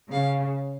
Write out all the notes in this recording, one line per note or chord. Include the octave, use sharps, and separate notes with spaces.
C#3 F5